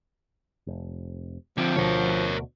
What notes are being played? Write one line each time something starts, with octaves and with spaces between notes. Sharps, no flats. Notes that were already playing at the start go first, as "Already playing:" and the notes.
F1
D3 F3 C4
D2 B2 D3 A#4 C#5